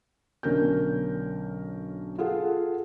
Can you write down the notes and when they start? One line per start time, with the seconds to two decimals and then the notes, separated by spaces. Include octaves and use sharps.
0.43 B1 D3 C#4 A#4 G6
2.18 F4 G#4 A4 F#5